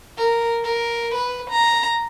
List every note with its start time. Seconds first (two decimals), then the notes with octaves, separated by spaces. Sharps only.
0.18 A#4
0.64 A#4
1.14 B4
1.50 A#5